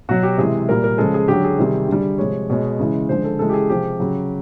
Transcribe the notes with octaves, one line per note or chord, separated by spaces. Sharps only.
B2 F#3 F#4
G4
C3 E3 G#3 G#4
A#2 G3 A#4
A#4
C#3 F3 G#3 A4
G#4
D3 F#3 G4
G#4
C3 D#3 G3
D3 G3
C3 F3 G#3 C#5
B2 G#3 C#5
C#3 E3 G#3
D3 F3 G#3 C5
A4
C#3 E3 G#3 A4
G4
G#4
C3 F3 G#3 G4
C#3 F#3